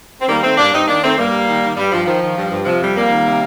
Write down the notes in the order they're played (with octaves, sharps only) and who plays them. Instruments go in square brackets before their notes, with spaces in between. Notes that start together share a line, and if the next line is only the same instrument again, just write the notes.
[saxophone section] C4
D#3 G3 A#3
D#3 A3 C4
G2 A#3 D4
G2 C4 D#4
D#3 A#3 D4
D#3 A3 C4
G2 G3 A#3
G2
D#3
D#3
G2 G3
G2 F3
D#3 F3
D#3
G2
G2
C3 F3
F2 G3
F2 G3 A#3
D#3
C3